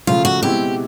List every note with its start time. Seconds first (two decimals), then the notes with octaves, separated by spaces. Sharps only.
0.07 C#3 F3 A3 F4
0.25 F#4
0.43 B2 G#3 C4 E4 G4